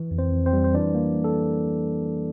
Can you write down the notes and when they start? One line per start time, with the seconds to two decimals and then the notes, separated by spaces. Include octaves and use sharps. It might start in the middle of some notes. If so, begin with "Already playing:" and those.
Already playing: E3
0.11 F2
0.18 C4 C5
0.32 F2
0.46 C4 C5
0.53 G3
0.64 C5
0.74 E3 D4 D5
0.95 A#3
1.24 A4